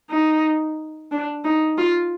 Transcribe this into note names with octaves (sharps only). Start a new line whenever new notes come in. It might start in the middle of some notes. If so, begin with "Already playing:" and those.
D#4
D4
D#4
F4